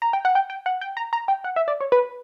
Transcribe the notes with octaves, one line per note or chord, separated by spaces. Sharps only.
A#5
G5
F#5
G5
G5
F#5
G5
A#5
A#5
G5
F#5
E5
D5
C#5
B4